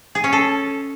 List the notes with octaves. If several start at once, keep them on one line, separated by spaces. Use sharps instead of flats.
G#4
C#4
A4